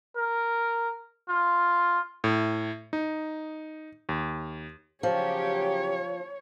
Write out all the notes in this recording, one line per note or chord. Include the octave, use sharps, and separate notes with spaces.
A#4
F4
A2
D#4
D#2
C#3 F3 F#3 G4 C#5